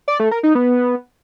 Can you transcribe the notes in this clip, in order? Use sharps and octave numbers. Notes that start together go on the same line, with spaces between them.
D5
A3
A#4
D#4
B3